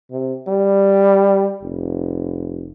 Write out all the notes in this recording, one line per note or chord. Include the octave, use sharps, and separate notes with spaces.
C3
G3
F1